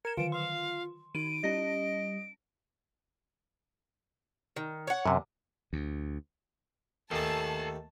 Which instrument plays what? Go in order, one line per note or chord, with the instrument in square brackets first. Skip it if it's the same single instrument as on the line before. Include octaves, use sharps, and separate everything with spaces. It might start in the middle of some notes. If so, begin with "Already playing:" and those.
[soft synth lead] A#4 [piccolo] G#6 [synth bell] C#7 E7
[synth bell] D3 D#3 [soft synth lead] F4 [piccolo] D7
[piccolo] F5 [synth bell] C6
[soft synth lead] D#3 [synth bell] D#4 D#7 [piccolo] D7
[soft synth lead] G3 [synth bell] C#4 A#6 [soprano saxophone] D#5
[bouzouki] D#3
C#5 F#5
[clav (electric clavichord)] F#2 C3
[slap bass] D2
[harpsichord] D#2 A3 [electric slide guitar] A4 G#5 [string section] A5